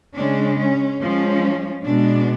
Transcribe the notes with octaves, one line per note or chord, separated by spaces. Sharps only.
C#3 G#3 C#4 D4
C#4
F3 G#3 C#4
B2 G#3 B3 D4